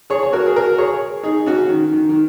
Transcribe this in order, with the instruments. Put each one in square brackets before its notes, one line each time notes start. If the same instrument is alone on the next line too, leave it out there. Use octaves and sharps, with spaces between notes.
[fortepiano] G#4 C#5
C#5
F#4 A#4
G#4
F#4 A#4
G#4 C#5
D#4 G#4
C#4 F#4
D#3
D#3
D#3